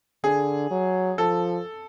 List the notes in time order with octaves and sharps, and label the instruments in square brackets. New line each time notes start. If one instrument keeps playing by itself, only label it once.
[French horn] D3 [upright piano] G#4
[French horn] F#3
[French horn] F3 [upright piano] A4